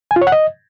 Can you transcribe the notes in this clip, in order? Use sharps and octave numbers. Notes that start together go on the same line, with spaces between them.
G#5
F4
C#5
F#5
D#5